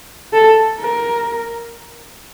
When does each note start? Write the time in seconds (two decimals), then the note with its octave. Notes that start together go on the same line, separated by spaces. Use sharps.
0.33 A4
0.81 A#4